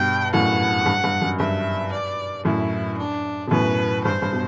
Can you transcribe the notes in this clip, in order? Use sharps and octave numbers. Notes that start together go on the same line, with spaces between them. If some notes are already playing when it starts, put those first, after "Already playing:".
Already playing: G2 B2 G5
F#2 A2 F#5
G2
G2
F#2
G2 E5
D5
F#2 A2 E4
D4
B2
F#2 A2 B4
G2 C5
G2
B2